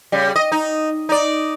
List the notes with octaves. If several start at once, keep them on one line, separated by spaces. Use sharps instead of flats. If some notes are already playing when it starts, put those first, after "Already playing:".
C#3 G3
D#5
D#4
D#4 D5